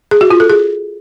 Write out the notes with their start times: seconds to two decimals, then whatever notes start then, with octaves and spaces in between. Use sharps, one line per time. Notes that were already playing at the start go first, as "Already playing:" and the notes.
0.11 G#4
0.21 F#4
0.30 F4
0.40 A4
0.50 G#4